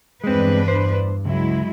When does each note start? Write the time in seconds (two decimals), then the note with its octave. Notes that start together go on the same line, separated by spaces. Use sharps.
0.24 E2 G2 G#3 C4 D4 B4
0.68 C5
1.25 C#2 F#3 G#3 E4